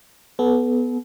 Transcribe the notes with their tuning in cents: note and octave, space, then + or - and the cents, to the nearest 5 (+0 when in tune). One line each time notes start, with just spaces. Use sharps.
B3 +0 A4 -40